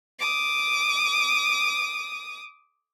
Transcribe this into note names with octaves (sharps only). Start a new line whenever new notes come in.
D6 D#6